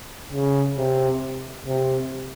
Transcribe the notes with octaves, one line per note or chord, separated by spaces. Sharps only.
C#3
C3
C3